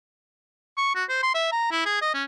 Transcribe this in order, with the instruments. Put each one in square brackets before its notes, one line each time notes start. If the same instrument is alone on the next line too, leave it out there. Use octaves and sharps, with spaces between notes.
[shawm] C#6
F#4
C5
C6
E5
A#5
E4
G#4
D#5
C#4